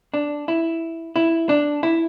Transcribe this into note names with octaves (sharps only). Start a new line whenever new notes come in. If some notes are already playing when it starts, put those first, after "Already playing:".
D4
E4
E4
D4
E4